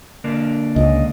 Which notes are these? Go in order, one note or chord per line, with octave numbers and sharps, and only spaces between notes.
D3 A#3 D4
C#2 D#5